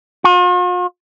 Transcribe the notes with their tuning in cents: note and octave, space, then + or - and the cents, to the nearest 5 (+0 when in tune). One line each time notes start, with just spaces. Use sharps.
F4 +45